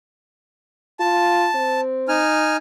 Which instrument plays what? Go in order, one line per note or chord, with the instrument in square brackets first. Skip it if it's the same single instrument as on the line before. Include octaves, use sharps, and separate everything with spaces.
[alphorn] F4 [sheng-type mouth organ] A5
[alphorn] C4
[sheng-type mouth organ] D#4 G#5 F6